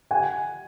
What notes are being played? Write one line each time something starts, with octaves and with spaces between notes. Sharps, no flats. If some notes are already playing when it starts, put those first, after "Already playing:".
F#5 G#5